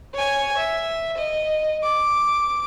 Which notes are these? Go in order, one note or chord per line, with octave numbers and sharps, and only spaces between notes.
C#5 G#5
E5
D#5
D6